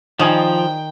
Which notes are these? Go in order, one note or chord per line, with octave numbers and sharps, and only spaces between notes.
D#3 F3 G3 D#5 G5 G#5